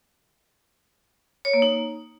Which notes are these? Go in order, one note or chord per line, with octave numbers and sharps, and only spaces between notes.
C#5
A#3
D#4